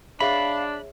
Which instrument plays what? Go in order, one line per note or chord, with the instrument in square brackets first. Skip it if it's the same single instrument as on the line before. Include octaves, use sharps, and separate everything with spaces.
[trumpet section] D4 [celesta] G#4 C#5 E5 [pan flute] F5 [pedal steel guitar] B5